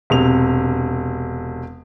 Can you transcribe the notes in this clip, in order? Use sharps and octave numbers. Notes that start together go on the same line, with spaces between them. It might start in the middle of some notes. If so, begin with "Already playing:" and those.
E1 C3 F7